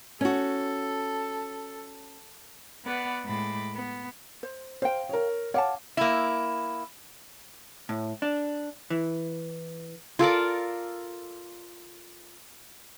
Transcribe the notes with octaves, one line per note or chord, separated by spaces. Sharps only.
C#4 F#4 A4
B3 B4 D5 F#5
A2 G#3 B5 D6 A6
B3
C5
C5 F5 G5
A#4 C#5
C#5 F5 F#5 A5 D6
A#3 E4
A2
D4
E3
F4 A4 A#4 D5